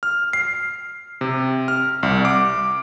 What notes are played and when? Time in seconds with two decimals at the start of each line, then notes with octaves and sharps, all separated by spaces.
0.03 F6
0.33 C7
1.21 C3
1.68 F6
2.03 C2
2.25 D6